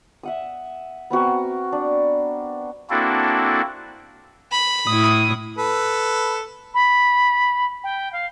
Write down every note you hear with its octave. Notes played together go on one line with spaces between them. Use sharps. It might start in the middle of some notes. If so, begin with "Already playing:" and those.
E5 F#5 D#6
B3 C4 F#4 A#4
D4
A#3 C4 D4 E4 F#4 A4
B5
A2 E4 D#6
A4 B4
B5
G5
F5